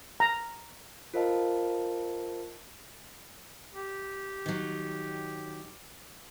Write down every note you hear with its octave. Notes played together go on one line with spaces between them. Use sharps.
A#5
F4 A#4 C5 D#5 F5 A5
G4
D#3 F#3